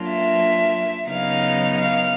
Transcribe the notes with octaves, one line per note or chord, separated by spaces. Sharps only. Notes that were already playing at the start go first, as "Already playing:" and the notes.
Already playing: F#3 A#3 D4 F4
E5
C#3 F#3 B3 D#4 F5
F5